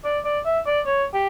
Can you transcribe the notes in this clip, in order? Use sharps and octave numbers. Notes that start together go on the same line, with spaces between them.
D5
D5
E5
D5
C#5
G4